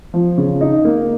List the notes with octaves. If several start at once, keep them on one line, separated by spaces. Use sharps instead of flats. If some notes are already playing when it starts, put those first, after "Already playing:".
F3
C#3
D#4
A#3